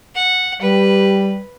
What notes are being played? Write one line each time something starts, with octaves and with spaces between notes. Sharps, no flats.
F#5
G3 G4 B4